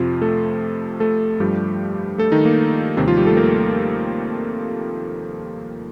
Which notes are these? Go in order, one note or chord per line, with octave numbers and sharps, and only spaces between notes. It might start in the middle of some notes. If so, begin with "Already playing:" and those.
Already playing: F2 C3 F3 F4
A3 A4
A3 A4
G2 F3 G3 A3 G4
A3 A4
D#3 D#4
A#3
D#2 C3 D#3 G3 C4
F3 F4
G3 G4
A3 A4
A#3 A#4